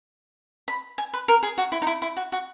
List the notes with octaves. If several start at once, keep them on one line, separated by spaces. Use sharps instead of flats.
B5
G#5
B4
A#4
G#4
F#4
E4
D#4
E4
E4
F#4
F#4